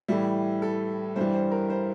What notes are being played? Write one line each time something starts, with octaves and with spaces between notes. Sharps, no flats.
A2 E3 G3 E4
A4
G2 E3 G3 C5
C5
A#4
C5